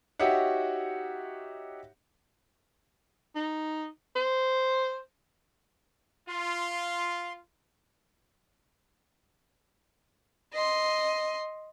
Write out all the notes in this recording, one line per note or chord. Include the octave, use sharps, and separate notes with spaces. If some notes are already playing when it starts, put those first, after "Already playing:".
D#4 F#4 G4 C#5 E5 F#5
D#4
C5
F4 C6
D#5 C6